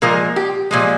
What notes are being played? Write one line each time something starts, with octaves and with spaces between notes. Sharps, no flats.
A#2 F3 G#3 A#4
G4
A#2 F3 G#3